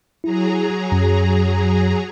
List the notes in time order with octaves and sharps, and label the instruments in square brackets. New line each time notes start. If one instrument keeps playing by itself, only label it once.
[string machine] F#3 G#4 A#5 [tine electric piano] E4
[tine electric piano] F#2